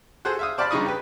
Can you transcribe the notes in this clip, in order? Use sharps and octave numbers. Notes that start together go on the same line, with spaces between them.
F#4 G#4 A4 C5 F#5
E5 F5 D#6
C5 D5 F5 A5 B5
G2 C#3 D#4 C#6 D#6
G4 B4